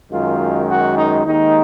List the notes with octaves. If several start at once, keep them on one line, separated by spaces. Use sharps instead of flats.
F#2 D#3 G#3 F4
F#4
D#4
D#2 D#3 G#3 D#4